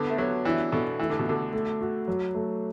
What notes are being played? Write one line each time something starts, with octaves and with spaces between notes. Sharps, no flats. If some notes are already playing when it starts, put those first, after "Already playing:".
Already playing: D3 B3
A3
F#3 F#4
E3 D4
B2 A4
E3 A3
D3
B2
D3 F#4
A3
F#4
F#3
A3